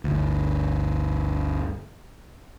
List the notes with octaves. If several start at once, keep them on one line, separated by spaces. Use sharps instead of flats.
G1 D2